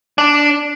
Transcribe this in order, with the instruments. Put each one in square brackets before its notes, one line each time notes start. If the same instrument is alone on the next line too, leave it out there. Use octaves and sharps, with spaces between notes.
[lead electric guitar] D4